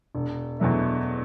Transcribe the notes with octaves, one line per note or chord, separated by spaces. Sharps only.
E1
E2 B2 F#3 A3